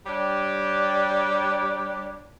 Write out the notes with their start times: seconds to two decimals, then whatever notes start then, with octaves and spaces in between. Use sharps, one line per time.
0.06 G3 D4 G4 C#5 D5